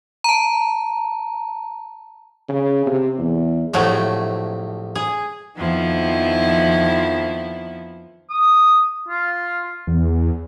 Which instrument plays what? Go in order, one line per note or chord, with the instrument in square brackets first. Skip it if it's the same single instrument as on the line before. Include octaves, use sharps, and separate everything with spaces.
[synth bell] A5 A#5
[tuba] C#3
C3
E2
[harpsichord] A#1 C3 [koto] A2 F#3 A3
[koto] G#4
[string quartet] F2 D#3 F3 B3 E4
[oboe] D#6
F4
[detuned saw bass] E2